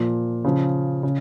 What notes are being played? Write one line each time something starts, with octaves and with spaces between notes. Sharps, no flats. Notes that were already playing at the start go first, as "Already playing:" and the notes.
Already playing: A#2 F3
C#3 F3
C#3